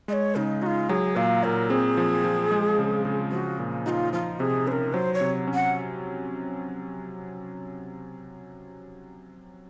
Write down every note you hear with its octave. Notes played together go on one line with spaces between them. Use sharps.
G#3 C#5 D#5
C#3 D#4
D#4 F4 F#4
F#3 G#4
A#2 F5
A#2 A#4
C4 G#4
F3
F3
G#3
C#3
C#3
F3 F#4
A#2
D#4 F4 F#4
F3 F4
C3 G#4
C#4 A#4 C5
F#3 C5
C#5
C3
C#4
F#5